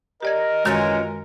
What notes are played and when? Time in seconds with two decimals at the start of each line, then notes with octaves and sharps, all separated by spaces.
0.22 G4 A#4 D5 D#5 G#6
0.65 F#2 D#3 E3 G#3 C#4 F4 F#4